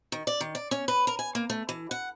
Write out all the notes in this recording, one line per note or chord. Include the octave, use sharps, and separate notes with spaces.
D#3
D5
D#3
D5
C#4
B4
A#4
G#5
A#3
A3
E3
F#5